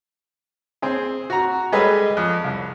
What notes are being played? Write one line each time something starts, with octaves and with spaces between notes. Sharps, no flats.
C4 G#4
F#4 A#5
G3 G#3 G#4 A4 B4 D#5
F2
C2